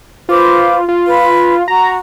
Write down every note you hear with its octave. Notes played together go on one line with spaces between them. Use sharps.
F4 B4 C5 D6
F4
B4
F#4 A#5